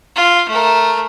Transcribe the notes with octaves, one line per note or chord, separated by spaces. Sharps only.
F4
A3 A#4